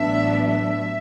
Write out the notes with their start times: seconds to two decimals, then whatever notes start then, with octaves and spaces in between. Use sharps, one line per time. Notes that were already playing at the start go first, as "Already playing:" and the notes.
Already playing: A1 A2 F#3 B3 D4 E5
0.48 E5